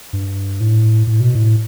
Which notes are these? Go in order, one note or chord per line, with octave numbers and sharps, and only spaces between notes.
G2
A2
A2
B2
A2